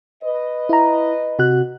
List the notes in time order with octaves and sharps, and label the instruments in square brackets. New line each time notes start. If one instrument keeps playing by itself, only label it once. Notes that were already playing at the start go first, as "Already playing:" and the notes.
[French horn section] B4 D#5
[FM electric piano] E4 A#5
C3 F#4 F#6